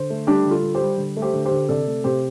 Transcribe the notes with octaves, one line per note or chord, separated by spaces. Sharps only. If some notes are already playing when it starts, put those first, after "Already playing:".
Already playing: D3 C5
A3
G3 D4 G4
D3
F4 A4
G3
G4 C5
G3
D3
A3
G4 C5
D3
G4 C5
D3
C3 A4 D5
A3
C3 G4 C5